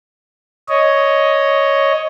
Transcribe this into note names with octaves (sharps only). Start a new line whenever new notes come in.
C#5 D#5